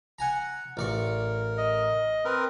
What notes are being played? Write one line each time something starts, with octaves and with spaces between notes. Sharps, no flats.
F#5 G#5 A#5
A1 A#4 D5 C#6
D#5
C4 A#4 B4